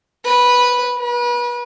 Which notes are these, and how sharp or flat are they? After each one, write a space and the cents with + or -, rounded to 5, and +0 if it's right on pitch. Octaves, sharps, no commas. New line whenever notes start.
B4 -10
B4 -35